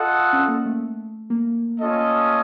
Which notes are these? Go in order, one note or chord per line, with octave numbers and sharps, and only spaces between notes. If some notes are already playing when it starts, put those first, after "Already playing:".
Already playing: F4 A4 D#5 F#5
C#4
A#3
A3
A#3
C#4 F4 A4 D#5